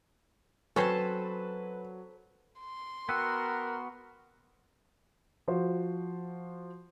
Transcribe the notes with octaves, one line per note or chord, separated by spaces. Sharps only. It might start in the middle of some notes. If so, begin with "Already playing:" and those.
F#3 C4 C#4 A4 B4 C5 A5
C6
B3 F#4 A#4 G5 E6 F#6
F3 F#4 C5